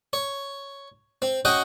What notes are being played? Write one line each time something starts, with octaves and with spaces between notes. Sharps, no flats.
C#5
C4
C#4 F#4 D#5 F#5 G5